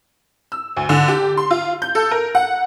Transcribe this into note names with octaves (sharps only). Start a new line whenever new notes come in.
E6
D2
D3
G4
C6
F4
G6
A4
A#4
F#5